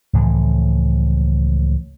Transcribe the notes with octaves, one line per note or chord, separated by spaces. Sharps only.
C#2 A2 E3 F3